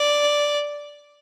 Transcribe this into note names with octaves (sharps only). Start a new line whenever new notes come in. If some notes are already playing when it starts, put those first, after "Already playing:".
Already playing: D5